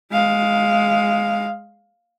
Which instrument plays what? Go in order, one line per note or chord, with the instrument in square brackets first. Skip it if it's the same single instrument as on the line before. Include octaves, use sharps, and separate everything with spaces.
[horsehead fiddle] G#3 F5